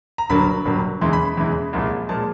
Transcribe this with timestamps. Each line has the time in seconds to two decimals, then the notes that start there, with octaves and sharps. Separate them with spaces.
0.18 A#5
0.29 G1 G2 D3 F#3 A#3 B5
0.65 G1 G2 D3 F#3 A#3
1.01 E2 C#3 E3 G#3 C6
1.13 B5
1.25 B5
1.37 E2 C#3 E3 G#3
1.73 C2 A#2 F3 G#3
2.09 A#2 F3 G#3 A5